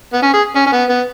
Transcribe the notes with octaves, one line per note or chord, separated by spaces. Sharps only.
B3
C#4
G#4
C#4
C#4
B3
B3